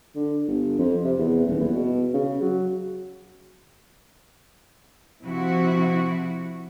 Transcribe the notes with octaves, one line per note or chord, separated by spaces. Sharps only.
D3
G1
F2
C3
E2
D#1
E2
B2
C#3
F#3
C3 F3 E4 F#4